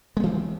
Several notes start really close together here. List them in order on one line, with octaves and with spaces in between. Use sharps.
G#3 B3 E3 C4